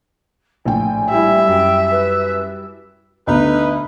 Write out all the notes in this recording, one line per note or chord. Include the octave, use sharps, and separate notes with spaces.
A#1 A2 G5 G#5
G3 E4 E5
F#2 G5
B4
D2 B2 D#4 B4